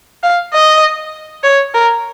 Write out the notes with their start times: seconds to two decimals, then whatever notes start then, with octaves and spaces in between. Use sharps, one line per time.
0.23 F5
0.53 D#5
1.44 C#5
1.74 A#4